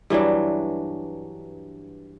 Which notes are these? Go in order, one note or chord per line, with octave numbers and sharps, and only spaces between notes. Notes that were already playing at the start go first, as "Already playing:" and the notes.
G2 E3 F#3 D4